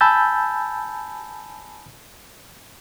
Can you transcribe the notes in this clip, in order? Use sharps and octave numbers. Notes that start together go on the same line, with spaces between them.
G#5 A5 B5 E6 G6 A6